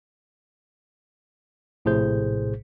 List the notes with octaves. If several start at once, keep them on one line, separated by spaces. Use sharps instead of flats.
A#1 A2 C3 G#4 C5 G6